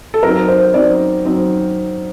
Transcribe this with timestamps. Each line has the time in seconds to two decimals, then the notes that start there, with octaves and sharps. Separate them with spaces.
0.14 A4
0.23 F#3 C4 D#4 A#4
0.48 C5
0.74 F#3 C4 D#4 D5
1.25 F#3 C4 D#4